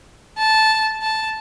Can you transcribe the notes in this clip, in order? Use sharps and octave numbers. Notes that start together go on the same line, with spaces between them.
A5
A5